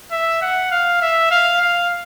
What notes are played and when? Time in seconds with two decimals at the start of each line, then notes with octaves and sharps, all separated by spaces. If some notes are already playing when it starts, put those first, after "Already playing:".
0.11 E5
0.42 F#5
0.71 F5
1.01 E5
1.31 F5
1.61 F5